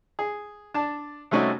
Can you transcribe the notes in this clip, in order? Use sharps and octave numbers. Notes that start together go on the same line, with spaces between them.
G#4
D4 A5
C3 G3 A3 C#4 D#4 F#4